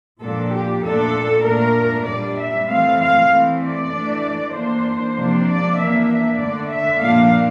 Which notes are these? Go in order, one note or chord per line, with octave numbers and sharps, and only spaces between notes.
A#2 F3 A#3 D4 A4
G4
A#2 A3 D4 A4
A#2 A3 D4 A#4
A#2 G3 D4 D5
E5
E3 A3 C4 F5
F5
E3 A3 C4
D5
E3 A3 D4
E3 A#3 D4 C5
C3 F3 A#3 D4
D5
E3 A#3 D4 E5
E5
D3 A3 D4 D5
E5
A#2 F3 A#3 D4 F5